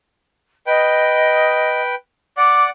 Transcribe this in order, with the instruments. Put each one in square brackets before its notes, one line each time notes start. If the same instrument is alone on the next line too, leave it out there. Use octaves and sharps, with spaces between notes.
[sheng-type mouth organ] B4 G5 [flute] D#5
[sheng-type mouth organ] D5 F#5 [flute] D6